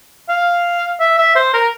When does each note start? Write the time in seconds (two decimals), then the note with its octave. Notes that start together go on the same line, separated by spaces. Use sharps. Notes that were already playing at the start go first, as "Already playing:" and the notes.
0.29 F5
1.00 E5
1.18 E5
1.35 C5
1.54 A#4